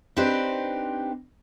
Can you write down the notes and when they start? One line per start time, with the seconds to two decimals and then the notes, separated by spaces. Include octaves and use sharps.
0.17 C4 D4 D#4 G4 B4 C5